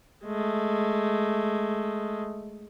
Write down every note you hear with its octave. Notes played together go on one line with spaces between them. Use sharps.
G#3 A3